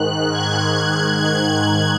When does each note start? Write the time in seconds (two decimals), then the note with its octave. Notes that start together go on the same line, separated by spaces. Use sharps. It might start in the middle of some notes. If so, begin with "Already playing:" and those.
Already playing: G#2 D#3 F#6
0.31 G#6
1.18 G#6